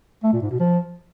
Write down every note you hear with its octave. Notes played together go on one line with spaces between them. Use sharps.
A3
A#2
G#2
B2
F3